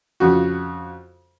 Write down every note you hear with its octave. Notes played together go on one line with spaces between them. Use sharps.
F2 C#3 F#4